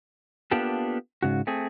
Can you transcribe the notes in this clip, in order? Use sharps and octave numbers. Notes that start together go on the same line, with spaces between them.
A#3 B3 D4 F4 G4 A4
G#2 C#3 F#4
A3 C4 G#4